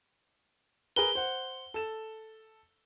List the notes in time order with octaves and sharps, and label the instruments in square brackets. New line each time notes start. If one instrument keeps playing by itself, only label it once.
[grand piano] G#4 A#4 B4 [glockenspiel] G7
[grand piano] C5 F#5
A4 E7